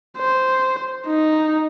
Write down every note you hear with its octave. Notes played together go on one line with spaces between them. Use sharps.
C5
D#4